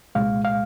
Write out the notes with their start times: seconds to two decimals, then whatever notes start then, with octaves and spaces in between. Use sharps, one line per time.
0.15 C2 A#2 G#3 F5
0.45 F5